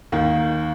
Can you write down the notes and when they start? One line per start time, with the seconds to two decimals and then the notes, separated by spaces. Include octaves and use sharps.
0.12 D#2 D#3